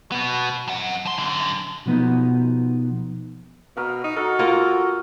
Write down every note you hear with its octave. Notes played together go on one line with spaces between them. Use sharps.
B2 B3
F#2 F#5
F3 C6
F#2 D3
B2 F3 B3 D#4
B2 A#4 F#5
D#4
F#4 A4 A#4
A#3 F4 D#5